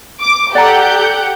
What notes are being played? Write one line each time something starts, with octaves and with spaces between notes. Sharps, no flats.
D6
G4 A4 D5 F#5 A#5 G6